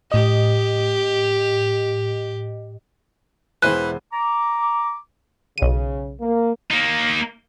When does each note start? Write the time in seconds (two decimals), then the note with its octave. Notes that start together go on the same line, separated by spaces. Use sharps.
0.12 A2 G4 D#5
3.63 E1 E3 C5 F#6 D#7
4.13 A#5 D6
5.58 B1 C#3 D#7
6.21 A#3
6.71 A#3 D#4